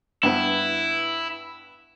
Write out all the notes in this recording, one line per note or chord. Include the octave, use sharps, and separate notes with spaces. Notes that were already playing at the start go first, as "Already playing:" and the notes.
G2 B3 E4 B4